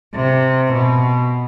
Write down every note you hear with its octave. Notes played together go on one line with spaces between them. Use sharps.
C3
B2